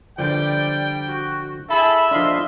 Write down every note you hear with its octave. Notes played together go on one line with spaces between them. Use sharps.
D3 F3 G3 D5 G5
F#4
E4 G#4 A4 E5 B5
F3 D4 A4 D#5 F5 C6